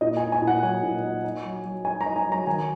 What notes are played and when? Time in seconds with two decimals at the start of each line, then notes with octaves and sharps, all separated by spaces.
0.01 A#2 D#5
0.17 G#5
0.22 D#4
0.32 G#5
0.42 A#2
0.47 F#5
0.63 F#3 G#5
0.83 A#2
1.03 D#4
1.24 D#4
1.45 F#3
1.65 F#3
1.85 D#4 G#5
2.01 A#5
2.06 D#4
2.16 G#5
2.26 F#3
2.32 A#5
2.47 D#3 G#5